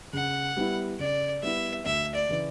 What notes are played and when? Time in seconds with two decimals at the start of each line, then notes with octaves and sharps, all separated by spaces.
0.13 C#3 F#5
0.57 G3 B3 E4
0.99 C#3 D5
1.43 G3 B3 E4 E5
1.85 D2 E5
2.15 D5
2.29 C#3 E3